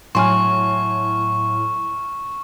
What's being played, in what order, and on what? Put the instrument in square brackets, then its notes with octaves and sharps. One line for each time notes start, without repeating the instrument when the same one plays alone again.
[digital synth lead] A2 [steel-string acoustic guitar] F#3 A3 [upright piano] G#5 C6 [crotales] C#6 F6